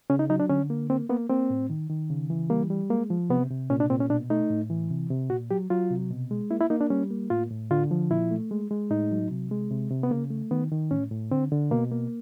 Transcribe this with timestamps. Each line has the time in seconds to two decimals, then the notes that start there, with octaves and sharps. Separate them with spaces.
0.10 C#3 C#4
0.19 D#4
0.29 F#3 D#4
0.40 D4
0.49 D3 C#4
0.70 A#3
0.90 A#3 C4
1.09 A#3 B3
1.30 A#3 C4
1.50 A2
1.70 D#3
1.90 D#3
2.10 C#3
2.30 E3
2.50 G3 A#3
2.70 G3
2.90 G#3 A#3
3.10 F3
3.30 C3 B3
3.50 C3
3.70 A#2 C#4
3.80 D4
3.90 A#2 C4
4.00 C#4
4.10 B2 D4
4.30 A3 D#4
4.50 A2
4.70 E3
4.90 C3
5.10 C3
5.30 A#2 F#4
5.51 F#3 G4
5.70 F#3 F4
5.91 C3
6.10 B2
6.31 G#3
6.50 A#3 E4
6.61 E4
6.70 A#3 D#4
6.81 D4
6.90 G3 C#4
7.11 A#3
7.30 A2 F4
7.51 A2
7.71 D3 F4
7.91 F3
8.10 A#2 E4
8.31 A3
8.51 G#3
8.71 G#3
8.91 A2 D#4
9.11 F#3
9.31 C3
9.51 G#3
9.71 C3
9.91 C3
10.03 B3
10.11 C#3 A#3
10.31 A3
10.51 D#3 B3
10.72 D#3
10.91 A2 C#4
11.11 A2
11.31 D3 C4
11.52 D3
11.71 B2 A#3
11.92 A#3